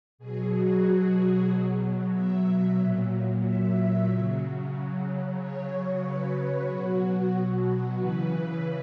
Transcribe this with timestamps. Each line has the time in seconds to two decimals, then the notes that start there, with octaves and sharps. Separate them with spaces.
0.18 B2 F#3 G#4
0.51 F#4
1.49 B2 F#3
2.13 E5
2.78 A#2 F#3
3.42 E5
4.07 C#3 F#3
5.37 C#3 F#3 C#5
6.02 B4
6.67 B2 F#3 F#4
7.97 C#3 E3 B4